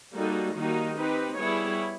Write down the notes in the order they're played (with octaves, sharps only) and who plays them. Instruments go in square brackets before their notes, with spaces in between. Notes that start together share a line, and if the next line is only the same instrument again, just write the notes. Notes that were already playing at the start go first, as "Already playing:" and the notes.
[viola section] G3 A#3 D#4 F#4 A4
D#3 G3 A#3 D#4 F#4
C4 D#4 G4 B4
G3 B3 E4 G#4 C#5